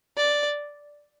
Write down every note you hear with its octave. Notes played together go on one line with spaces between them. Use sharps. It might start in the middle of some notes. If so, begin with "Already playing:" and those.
D5